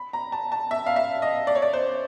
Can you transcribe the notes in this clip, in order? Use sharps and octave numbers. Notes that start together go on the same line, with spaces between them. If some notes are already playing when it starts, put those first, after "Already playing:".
Already playing: B5
A#5
A5
A5
E5
F5
E5
D#5
D5
C#5
D5
C5